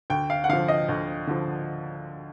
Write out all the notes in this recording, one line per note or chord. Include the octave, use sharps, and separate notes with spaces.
D2 G5
F5
F#5
D3 F3 F5
D#5
D2
D3 F3